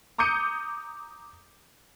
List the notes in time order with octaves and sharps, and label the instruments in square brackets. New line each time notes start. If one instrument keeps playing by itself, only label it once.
[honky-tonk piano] A#5 D6 D#6 G6 C#7 D#7